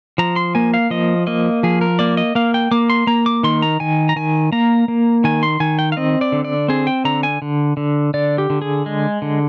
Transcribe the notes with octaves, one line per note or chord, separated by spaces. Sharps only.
F3 A#5
C6
A#3 G#5
F5
F3 D#5
A#3 D#5
F3 G#4
A#4
A#3 D5
D#5
A#3 F5
G5
A#3 D6
C6
A#3 A#5
D6
D#3 C6
A#5
D#3 G#5
A#5
D#3 G#5
A#3 A#5
A#3
D#3 G#5
C6
D#3 G#5
G5
F5
C4 D#5
D5
D3
D5
C4 G#4
G5
D3 A#5
G#5
D3
D3
D3 D5
G4
D3
G#4
G#3
D3